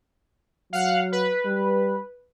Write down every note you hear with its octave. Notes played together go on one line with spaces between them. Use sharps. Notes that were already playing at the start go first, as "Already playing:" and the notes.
F#3 F5 F#5
B4
G3